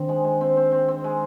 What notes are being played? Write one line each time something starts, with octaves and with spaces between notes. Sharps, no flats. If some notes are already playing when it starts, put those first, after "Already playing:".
Already playing: D#3 C4 D4 D#4
G#3
G#3
C4
C4
C4
C4
G#3